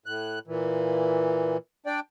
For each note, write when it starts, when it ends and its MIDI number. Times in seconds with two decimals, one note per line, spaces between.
0.06 0.39 45
0.06 0.39 90
0.47 1.57 46
0.47 1.57 52
1.86 2.00 62
1.86 2.00 74
1.86 2.00 79